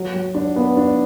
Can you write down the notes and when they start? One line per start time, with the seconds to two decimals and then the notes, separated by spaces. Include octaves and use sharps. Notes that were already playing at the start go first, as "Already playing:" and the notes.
Already playing: F#3
0.14 F#3
0.35 D4
0.56 B3
0.77 D4